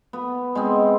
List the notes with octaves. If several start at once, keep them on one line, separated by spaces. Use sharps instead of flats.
B3
G#3 B3 C4